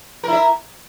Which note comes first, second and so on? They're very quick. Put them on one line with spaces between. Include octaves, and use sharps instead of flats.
A#4 E4 E5